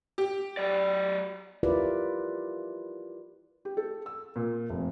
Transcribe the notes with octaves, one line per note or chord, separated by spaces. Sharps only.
G4
F#3 D5
E4 F4 G4 A#4 B4 D5
G4
A4
E6
A#2
F1